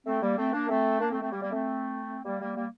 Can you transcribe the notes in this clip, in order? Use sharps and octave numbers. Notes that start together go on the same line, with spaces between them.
A3 C4
G3 A#3
A3 C4
A#3 D4
A3 C4
A#3 D4
A3 C4
A3 C4
G3 A#3
G3 A#3
A3 C4
G3 A#3
G3 A#3
G3 A#3